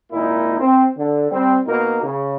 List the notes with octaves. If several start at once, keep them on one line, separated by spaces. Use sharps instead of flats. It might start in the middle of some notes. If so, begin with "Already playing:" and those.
G#1 A#2 A#3 D#4 E4
C4
D3
G3 C4
B2 A#3 B3 D#4 A#4
C#3